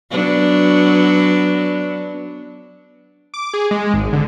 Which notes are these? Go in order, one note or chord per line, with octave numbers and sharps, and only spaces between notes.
F#3 B3 D4
D6
G#4
G#3
G#1
D3